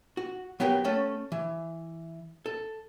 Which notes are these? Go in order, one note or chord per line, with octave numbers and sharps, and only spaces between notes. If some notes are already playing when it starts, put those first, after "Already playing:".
F#4
F#3 B3 G4 A#4 G5
A3 C#4 A4
E3
A4